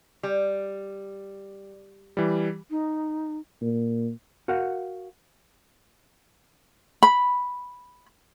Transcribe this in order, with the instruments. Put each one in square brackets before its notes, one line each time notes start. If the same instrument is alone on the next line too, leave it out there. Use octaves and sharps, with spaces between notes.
[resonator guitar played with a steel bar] G3
[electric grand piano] E3 G3
[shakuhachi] D#4
[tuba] A#2
[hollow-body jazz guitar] F#4 A#4 F5 F#5
[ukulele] B5